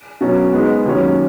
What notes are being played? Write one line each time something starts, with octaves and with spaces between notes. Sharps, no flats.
B2 F#3 C#4
G#2 G#3 B3
D#2 D#3 F#3 C#4